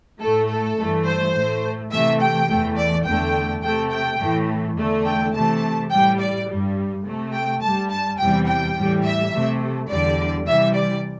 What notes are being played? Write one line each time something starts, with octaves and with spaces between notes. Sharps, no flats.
A2 A3 A4
A4
G2 E3 A3
C5
A2 A3
C3 E3 A3 E5
G5
E2 E3 A3
D5
E2 D3 A3 G5
C3 A3 G5
G5
A2 E3 A3
E2 D3 A3
G5
C3 E3 A3 A5
A2 G3 G5
D5
G2 G3
C3 A3
G5
G2 G3 A5
A5
E2 C3 E3 G3 G5
G5
A2 E3 G3
E5
C3 A3
E2 D3 G3 D5
C3 E3 G3 E5
D5